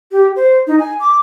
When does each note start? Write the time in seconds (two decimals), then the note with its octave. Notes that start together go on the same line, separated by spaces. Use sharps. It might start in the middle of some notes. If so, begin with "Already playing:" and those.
0.12 G4
0.36 C5
0.67 D#4
0.79 G#5
1.00 D6